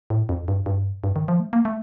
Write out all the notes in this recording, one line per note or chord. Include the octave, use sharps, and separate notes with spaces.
A2
F2
G2
G2
G2
D#3
F3
A3
A#3
A3